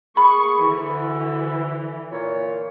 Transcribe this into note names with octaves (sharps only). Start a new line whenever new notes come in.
A#3 G#4 B5 C#6
D2 D3 E3
A#2 C#5